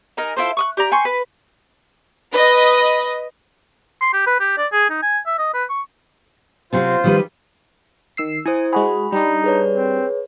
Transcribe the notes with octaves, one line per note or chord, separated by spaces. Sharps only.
D#4 A#4 G#5
E4 F4 A4 C5
C#6 D#6 F#6
G4 D5 A#5
G5 G#5 C6 C#6
B4
B4 D#5
C6
G4
B4
G4
D5
G#4
D#4
G#5
E5
D#5
B4
C#6
C3 F#3 C4 F4 C5
D#3 G3 B4
D#3 E6 C7
E4 C5 G#5 D#6
G#3 F#4 G#4 B5
G3 D4 D#4
G#4 B4 C#5
C4